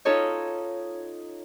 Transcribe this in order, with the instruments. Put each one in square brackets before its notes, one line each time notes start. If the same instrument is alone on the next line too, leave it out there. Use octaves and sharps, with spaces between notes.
[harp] C#4 D#4 F4 A4 C#5 D#5